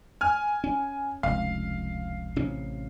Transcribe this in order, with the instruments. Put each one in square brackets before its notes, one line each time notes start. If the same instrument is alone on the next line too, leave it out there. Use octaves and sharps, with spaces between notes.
[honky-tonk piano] G#5 F6
[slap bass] C#4
[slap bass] F1 C#2 [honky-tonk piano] F5
[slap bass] A1 C3 C#4